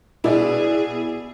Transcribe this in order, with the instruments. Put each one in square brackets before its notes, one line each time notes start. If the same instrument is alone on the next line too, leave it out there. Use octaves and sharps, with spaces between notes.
[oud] B2 [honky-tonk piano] E4 D5 [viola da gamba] G#4